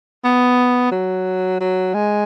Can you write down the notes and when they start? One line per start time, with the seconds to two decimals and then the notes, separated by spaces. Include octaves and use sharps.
0.24 B3
0.91 F#3
1.60 F#3
1.94 G#3